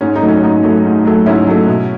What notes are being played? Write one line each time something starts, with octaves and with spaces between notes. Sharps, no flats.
G#2 C#4
D#4
F#3 A3
C#4
G#2 D#4
F#3 A3
G#2
F#3 A3
G#2 C#4 E4
F#3 A3
B2